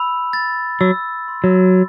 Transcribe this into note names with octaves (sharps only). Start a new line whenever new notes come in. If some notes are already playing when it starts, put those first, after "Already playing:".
Already playing: B5 E6
A6
F#3 E6
C6
F#3